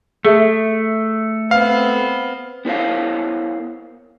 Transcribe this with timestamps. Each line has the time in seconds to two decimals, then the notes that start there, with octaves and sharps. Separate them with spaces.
0.25 A3 G#4 A4 E5
1.51 B3 C4 F5
2.65 B3 E4 A#4 C5 C#5 F5